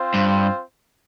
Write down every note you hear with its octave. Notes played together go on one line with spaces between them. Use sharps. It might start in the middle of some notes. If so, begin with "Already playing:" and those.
Already playing: C4 F4 C5
G2